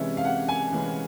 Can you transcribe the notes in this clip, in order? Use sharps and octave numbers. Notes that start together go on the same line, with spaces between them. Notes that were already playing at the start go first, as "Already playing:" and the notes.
Already playing: C2 C3 E3 G#3 C#4 E5
F5
F#5
G#5
C2 C3 E3 G#3 C#4